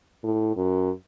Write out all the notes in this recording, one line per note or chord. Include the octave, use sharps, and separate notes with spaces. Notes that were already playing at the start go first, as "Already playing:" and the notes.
A2
F#2